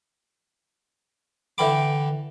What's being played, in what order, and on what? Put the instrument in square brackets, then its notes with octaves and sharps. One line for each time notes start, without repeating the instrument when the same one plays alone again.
[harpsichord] D3 E3 G5 B5 D6